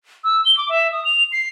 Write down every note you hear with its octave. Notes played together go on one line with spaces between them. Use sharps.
E6
G7
D6
E5
D#6
F7
C7